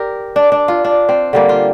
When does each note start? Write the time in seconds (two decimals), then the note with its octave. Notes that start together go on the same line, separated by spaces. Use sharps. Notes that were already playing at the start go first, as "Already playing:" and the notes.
Already playing: G4 A#4 D5
0.36 D4
0.52 D4
0.68 F4
0.84 D4
1.09 C4
1.33 D3 G3 A#3
1.49 F4